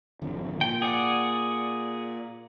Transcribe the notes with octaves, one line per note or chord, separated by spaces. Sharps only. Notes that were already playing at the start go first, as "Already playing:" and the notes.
G#1 F2 D3
A#2 G5
G#4 D5 F#5